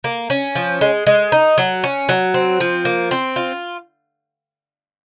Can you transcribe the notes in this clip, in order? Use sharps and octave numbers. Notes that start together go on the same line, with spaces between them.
A#3
C#4
F3
G#3
G#3
D#4
F#3
C#4
F#3
C4
F3
A#3
C4
F4